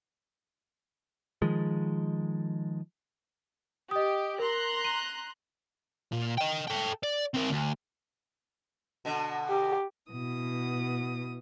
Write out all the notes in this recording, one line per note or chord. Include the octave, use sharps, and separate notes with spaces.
D#3 F3 G#3
G4 D#5 D#6
A#4 A#5 C6 F#6
D#7
A#2
D#5 G5
A4 G5
D5
C4 A#4
D2
B2 D3
G4
B2 E3 D#6